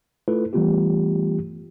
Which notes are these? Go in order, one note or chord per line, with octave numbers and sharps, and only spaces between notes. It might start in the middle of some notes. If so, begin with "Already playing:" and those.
A3 E4 F4 A4 B4
E3 G3 A3 B3 F4 G4